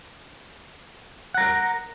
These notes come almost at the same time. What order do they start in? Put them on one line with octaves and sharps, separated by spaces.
F#5 A#5 A#4